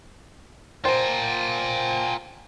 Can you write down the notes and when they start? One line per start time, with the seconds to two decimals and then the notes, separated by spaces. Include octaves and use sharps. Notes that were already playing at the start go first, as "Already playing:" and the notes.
0.85 F4 A#4 C5 G5 G#5